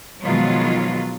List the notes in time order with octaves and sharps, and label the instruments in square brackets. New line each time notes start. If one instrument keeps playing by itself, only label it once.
[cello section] B2 D#3 F3 F#3 G#3 F4